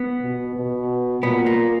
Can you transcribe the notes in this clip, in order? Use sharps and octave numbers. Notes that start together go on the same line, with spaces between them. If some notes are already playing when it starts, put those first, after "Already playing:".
Already playing: B3
B2
B2
A#2 B3
A#3